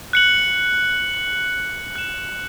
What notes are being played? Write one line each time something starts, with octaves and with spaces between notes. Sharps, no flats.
F#6 C#7 F#7
F#6 E7